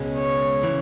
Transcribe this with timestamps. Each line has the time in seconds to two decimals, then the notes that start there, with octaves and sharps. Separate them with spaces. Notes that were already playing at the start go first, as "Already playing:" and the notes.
Already playing: C#2 B2 G#3 C#4
0.17 C#5
0.63 C#3 E3